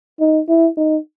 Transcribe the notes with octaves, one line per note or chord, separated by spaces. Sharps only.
D#4
E4
D#4